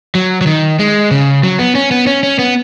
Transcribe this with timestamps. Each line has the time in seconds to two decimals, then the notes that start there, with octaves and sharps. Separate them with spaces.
0.15 F#3
0.41 F#3
0.46 D#3
0.79 G#3
1.11 C#3
1.43 F#3
1.59 B3
1.75 C#4
1.91 B3
2.07 C#4
2.23 C#4
2.39 B3